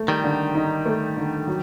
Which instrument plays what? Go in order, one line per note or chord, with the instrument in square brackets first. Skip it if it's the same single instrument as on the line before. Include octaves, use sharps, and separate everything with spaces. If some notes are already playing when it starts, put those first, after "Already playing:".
Already playing: [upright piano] A3
[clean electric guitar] D#3 G3
[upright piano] D3
D#4
A3
D3
F#3